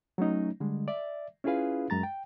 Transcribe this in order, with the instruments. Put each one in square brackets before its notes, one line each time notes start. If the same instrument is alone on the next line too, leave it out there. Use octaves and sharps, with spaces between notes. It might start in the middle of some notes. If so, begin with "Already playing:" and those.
[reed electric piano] F#3 A3 C#4 D#4
D3 G3 G#3
D5 E5
C#4 E4 F4 G#4 B4 F5
F#2 G#3 A#5 A6
G5